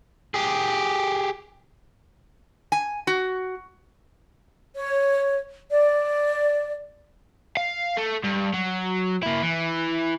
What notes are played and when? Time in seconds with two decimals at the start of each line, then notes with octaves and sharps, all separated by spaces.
0.34 G4 G#4
2.72 G#5
3.07 F#4
4.75 C#5
5.70 D5
7.57 F5
7.97 A3
8.24 G2
8.54 F#3
9.23 A#3 E4
9.42 E3